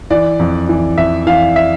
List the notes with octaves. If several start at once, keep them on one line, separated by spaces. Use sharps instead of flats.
E3 D5
F2
E3
F2 E5
E3 F5
E5